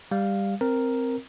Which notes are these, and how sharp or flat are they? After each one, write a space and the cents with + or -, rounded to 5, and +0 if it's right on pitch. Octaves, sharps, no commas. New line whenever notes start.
G3 +15 F5 +0
C4 +0 A#4 +0